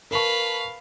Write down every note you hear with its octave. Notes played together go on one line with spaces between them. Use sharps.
A#4 B4 F5 A5 B5 C#6